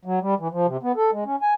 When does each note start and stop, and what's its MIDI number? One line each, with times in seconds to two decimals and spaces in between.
0.05 0.19 54
0.21 0.34 55
0.39 0.48 52
0.51 0.66 53
0.67 0.77 48
0.83 0.92 59
0.96 1.11 69
1.12 1.24 56
1.25 1.36 61
1.42 1.54 80